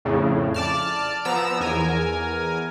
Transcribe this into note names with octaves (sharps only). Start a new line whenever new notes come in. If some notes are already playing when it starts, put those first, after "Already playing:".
F2 A2 C#3
D5 A5 F6
F3 B3 A#5 E6
E2 A#4 G#5